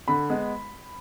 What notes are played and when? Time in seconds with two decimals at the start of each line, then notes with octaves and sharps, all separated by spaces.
0.08 D3 B5
0.29 G#3 B3